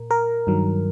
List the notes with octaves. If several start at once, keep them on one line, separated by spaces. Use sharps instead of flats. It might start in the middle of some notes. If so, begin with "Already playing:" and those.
Already playing: A#2 A#4
A#4
G2 D#3 F#3